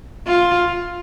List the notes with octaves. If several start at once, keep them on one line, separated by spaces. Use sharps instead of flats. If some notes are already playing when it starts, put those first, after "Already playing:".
F4